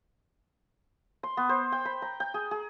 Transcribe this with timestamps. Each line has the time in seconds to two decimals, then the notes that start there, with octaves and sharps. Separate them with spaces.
1.23 C6
1.37 B3
1.49 C5
1.72 G5
1.85 B5
2.02 A#5
2.20 G5
2.34 G#4
2.51 G#4